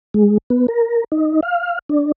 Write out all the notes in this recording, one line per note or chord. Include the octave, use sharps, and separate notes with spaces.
G#3
B3
A#4
D#4
F5
D4